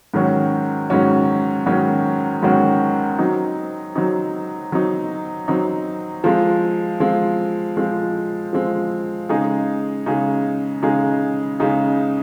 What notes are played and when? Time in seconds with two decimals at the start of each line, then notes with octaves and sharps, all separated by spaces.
0.14 G#2 D#3 F#3 C#4 F#4
0.90 G#2 D#3 F#3 C#4 F#4
1.66 G#2 D#3 F#3 C#4 F#4
2.42 G#2 D#3 F#3 C#4 F#4
3.19 F#3 C4 D#4
3.95 F#3 C4 D#4
4.72 F#3 C4 D#4
5.48 F#3 C4 D#4
6.24 F3 G#3 C4
7.00 F3 G#3 C4
7.77 F3 G#3 C4
8.53 F3 G#3 C4
9.29 C#3 G#3 D#4 G#4
10.06 C#3 G#3 D#4 G#4
10.82 C#3 G#3 D#4 G#4
11.60 C#3 G#3 D#4 G#4